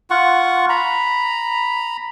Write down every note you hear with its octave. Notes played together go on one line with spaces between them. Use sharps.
F4 F#5 C#6
A#5 B5